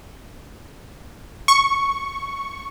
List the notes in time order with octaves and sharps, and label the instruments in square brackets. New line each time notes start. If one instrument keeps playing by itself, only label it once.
[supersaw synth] C#6